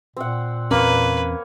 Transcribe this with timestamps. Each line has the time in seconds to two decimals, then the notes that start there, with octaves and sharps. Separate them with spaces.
0.17 A#2 C4 F#5
0.71 E2 A#3 C4 C#4 B4 C#5